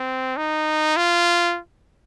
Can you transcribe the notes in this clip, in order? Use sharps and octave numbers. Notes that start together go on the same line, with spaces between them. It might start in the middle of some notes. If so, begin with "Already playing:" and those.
Already playing: C4
D#4
F4